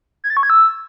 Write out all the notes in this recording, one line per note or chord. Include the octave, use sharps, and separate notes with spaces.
G#6
A6
C#6
G#6
E6